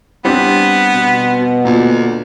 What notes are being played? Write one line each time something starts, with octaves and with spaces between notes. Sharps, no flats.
G3 B3 C4 D4
B2
D2 A#2